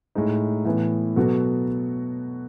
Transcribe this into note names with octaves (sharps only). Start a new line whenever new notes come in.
A2 G#3 D#4
A2 E3 B3
B2 F#3 B3 F#4 A4